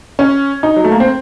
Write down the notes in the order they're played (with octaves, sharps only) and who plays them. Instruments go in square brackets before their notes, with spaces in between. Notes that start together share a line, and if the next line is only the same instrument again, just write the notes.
[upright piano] C#4
D#4
F#3
A3
A#3
C4